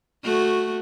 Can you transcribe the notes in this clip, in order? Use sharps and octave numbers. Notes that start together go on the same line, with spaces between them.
A3 F#4